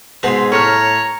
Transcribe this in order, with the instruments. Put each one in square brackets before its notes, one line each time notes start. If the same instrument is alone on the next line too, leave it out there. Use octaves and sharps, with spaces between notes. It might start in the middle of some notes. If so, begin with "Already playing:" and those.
[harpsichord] G#2 B2 D#4 [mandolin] C4 G#4 C6
[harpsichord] A2 A3 [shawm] C#5 [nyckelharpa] A#5 [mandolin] C#6 D#6 F6